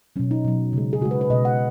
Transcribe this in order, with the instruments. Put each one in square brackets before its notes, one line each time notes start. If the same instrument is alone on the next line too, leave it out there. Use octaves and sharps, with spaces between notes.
[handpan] B2 F#3 C#4
D#4
B2 F#3
C#3 G#3
G#4
C#3 G#3 F#4
B4
B4
B2 G#3 D#5
F#5